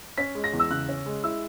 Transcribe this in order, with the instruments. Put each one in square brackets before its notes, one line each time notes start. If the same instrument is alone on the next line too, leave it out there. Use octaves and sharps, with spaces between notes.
[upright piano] C#4 B6
G#3
A#6
E2
E6
C#3 F#6
C#4
G#3
E4 E6